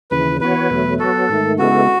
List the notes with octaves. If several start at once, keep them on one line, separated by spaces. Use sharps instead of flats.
D#2 C#3 E3 B4
E3 B3 F#4 B4 C#5
E2 B2 F#3 A3
F#3 B3 F#4 A4
G#2 D#3 A3
C#3 G#3 B3 E4 F#4 A4